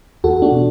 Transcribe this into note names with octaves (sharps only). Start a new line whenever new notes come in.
E2 F#4 A4
D4 F#4
B2